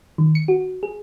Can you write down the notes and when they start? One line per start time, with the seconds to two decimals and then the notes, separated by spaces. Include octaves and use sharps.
0.18 D#3
0.35 C#7
0.48 F#4
0.83 G#4